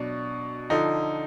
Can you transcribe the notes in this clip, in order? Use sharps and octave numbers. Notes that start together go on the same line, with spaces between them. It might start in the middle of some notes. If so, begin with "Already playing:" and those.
Already playing: B2 F#3 D4
D3 F3 D#4